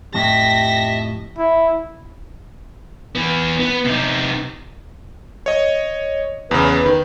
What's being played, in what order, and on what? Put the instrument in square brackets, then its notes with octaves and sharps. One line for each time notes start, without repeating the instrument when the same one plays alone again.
[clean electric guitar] F2 A2 [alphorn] G4 [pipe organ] D#5 E5 A5 [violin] A#6 B6
[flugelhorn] E4
[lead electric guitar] E3 B3
B3
C3 D#4
[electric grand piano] C#5 D#5
[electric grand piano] E2 C#3 [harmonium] B4
[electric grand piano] D#3